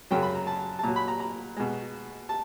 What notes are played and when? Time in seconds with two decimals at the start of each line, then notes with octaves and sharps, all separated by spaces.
0.11 F#2 C#3 F#3 G5
0.23 B5
0.35 A#5
0.47 A5
0.79 A5
0.83 A#2 F#3 A#5
0.96 B5
1.08 A#5
1.20 A#5
1.56 B2 G#3
2.29 A5